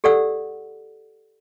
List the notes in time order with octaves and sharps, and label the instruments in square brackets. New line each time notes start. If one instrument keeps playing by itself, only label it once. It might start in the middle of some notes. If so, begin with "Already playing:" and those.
[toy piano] G4 A4 D5 F#5 E6